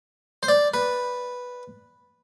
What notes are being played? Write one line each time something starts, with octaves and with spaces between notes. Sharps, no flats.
C5
D5
B4